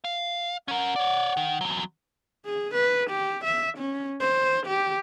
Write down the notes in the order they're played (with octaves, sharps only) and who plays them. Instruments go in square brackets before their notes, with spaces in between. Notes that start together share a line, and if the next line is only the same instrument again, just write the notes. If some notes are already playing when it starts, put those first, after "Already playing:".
[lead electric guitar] F5
[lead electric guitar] C#4 A#4 [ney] F#5
[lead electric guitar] C#5 D5
D#3
E2 F#3
[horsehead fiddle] G#4
B4
G4
E5
C#4
C5
G4